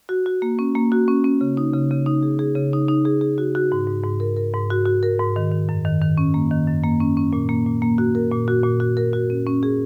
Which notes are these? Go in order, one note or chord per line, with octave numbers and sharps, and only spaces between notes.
F#4
F#4
A#3
C#4
A#3
F#4
C#4
C#4
C#3
D#4
C#3
C#3
D#4
G#4
G#4
C#3
D#4
D#4
G#4
G#4
F#4
F#4
G#2
G#2
G#2
A#4
A#4
G#2
F#4
F#4
A#4
G#2
D#3
D#3
F#2
D#3
D#3
C#4
A#3
D#3
F#2
A#3
C#4
C#4
A#2
A#3
A#2
A#3
F#4
A#4
A#2
F#4
A#2
F#4
A#4
F#4
C#4
C#4
G#4